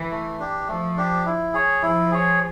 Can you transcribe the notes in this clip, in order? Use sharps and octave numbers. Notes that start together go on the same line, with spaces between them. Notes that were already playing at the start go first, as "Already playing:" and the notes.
Already playing: E3
A3
D4 G4
F3 A3
D4 G4
E4
G#4 C#5
F3 E4
G#4 C#5